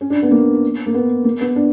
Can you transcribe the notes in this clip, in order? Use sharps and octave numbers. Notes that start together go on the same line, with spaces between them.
C#4
D4
B3
A#3
A#3
B3
A#3
B3
D4